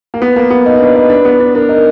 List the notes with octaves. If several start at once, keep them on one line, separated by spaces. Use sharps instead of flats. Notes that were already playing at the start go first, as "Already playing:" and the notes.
A#3
B3 B4
A#3
B3
D#4
D4
D#4
D4
B3
D4
D4 A#4
D#4